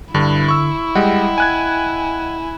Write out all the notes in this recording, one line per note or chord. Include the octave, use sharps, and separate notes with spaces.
G2 D3 E4
C#6 E6
G3 G#3 D#5 F#5 G5
G#5 F#6 G#6